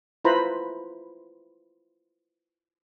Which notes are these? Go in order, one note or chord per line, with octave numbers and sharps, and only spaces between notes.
E4 F4 B4 C5 A#5 B5